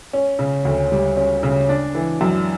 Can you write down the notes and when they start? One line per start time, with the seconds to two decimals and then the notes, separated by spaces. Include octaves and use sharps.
0.13 C#4
0.39 C#3
0.65 D2
0.92 G3
1.17 C#4
1.43 C#3
1.69 D4
1.95 E3
2.21 F#2